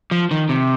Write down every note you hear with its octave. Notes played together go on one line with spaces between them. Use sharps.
F3
D#3
C3